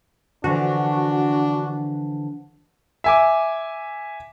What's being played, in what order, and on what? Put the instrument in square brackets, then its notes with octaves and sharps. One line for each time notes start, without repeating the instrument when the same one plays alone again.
[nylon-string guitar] D3 E3 F3 [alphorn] D4 [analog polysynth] F#4
[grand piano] E5 G#5 D6